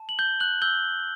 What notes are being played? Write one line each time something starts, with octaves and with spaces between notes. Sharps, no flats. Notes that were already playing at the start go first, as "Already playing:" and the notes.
Already playing: A5
F#7
G6 G7
F#6 F#7
E6 G6 G7